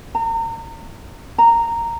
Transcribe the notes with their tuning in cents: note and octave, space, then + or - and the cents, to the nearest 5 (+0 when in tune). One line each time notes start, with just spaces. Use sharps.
A#5 -35
A#5 -10